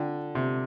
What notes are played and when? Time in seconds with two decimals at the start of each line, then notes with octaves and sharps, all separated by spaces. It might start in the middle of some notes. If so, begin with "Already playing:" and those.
Already playing: D3 F4 A4 D5 G5
0.35 C3